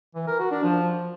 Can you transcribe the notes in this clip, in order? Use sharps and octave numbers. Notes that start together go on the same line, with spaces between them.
E3
A#4
F#4
D4
F3